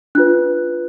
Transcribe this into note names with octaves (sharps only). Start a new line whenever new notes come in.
D4 F4 B4 F#6